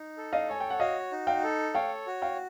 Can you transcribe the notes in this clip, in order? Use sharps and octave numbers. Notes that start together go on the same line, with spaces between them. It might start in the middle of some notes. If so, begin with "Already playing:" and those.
Already playing: D#4
A4
D#5 F5
C#5 G#5
G5
F#5
F#4 D#5 F5
D#4
F5 G5
A4
C#5 F5 G5
F#4
F5 G5